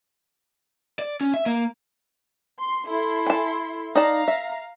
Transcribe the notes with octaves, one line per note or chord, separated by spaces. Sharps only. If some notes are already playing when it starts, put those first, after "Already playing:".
D5
C#4
E5
A#3
C6
E4 A4 C6
G#5 A5
D#4 D5 F5 A5 A#5
E5